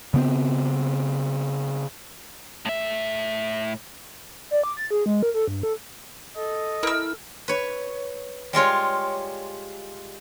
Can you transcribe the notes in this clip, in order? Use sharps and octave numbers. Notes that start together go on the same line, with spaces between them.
C#3 B3 C4
A2 E5
D5
D6
A6
G#4
G#3
A#4
A4
G2
A4
A4 D#5
E4 A#4 E6
B4 C#5
G3 G#3 F4 C#5